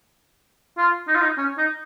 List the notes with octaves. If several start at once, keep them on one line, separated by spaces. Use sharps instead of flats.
F4
D#4
F4
D#4
C#4
D#4